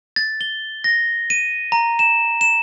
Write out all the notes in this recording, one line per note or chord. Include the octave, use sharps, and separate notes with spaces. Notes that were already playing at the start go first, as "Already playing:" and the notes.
A6
G7
A#6
D#7
A#5
E7
E7